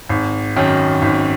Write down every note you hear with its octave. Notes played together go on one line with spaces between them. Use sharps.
G#1
F#2 D#3
G#1